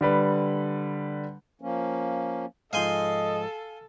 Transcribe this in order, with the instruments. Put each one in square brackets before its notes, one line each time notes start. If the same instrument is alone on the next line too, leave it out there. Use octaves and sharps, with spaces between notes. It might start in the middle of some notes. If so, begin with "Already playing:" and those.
[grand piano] D3 G3 B4
[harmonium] F3 A#3 C#4
[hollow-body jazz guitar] G#2 F3 [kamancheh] A4 [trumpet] D#5 [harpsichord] F5 G#5 C6